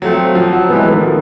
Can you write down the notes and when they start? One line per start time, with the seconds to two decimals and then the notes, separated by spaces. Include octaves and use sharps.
0.02 F3 F#3 A3 C4
0.35 F3
0.53 F#3
0.69 C3 E3 G#3 B3
0.85 A3
0.93 D#3
1.01 F3